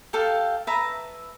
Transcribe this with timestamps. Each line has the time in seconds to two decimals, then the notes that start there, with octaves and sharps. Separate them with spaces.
0.13 G4 A4 F5
0.67 B4 E5 A5 A#5